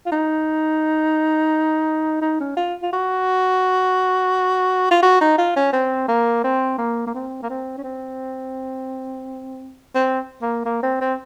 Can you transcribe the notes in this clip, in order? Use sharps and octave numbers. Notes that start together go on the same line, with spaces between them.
F4
D#4
D#4
C#4
F4
F4
F#4
F4
F#4
D#4
F4
C#4
C4
A#3
C4
A#3
A#3
C4
A#3
C4
C#4
C4
C4
A#3
A#3
C4
C4